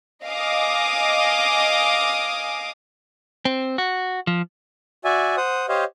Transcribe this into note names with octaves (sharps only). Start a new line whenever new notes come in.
D#5 F5 G#5 D6 D#6
C4
F#4
F3
F#4 D5 E5 G#5
C5 F#5 D#6
G4 C5 C#5 D#5 F5